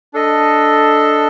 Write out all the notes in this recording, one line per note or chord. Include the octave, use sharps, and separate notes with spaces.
D4 A4 D#5